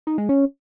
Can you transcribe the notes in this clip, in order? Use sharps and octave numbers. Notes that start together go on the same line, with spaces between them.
D#4
G#3
C#4